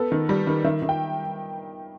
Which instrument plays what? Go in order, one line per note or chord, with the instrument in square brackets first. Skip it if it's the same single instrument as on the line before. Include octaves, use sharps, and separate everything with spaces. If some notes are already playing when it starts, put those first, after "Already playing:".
Already playing: [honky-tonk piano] B3 A4
D#3
G3
D#3
D#3 E5
D#3
G5